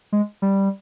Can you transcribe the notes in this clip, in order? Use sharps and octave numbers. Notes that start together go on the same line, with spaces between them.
G#3
G3